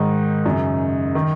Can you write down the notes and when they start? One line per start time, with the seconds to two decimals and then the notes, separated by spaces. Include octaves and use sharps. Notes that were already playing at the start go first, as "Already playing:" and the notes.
Already playing: G#2 D#3 D#4
0.46 F#2 C#3
1.15 D#3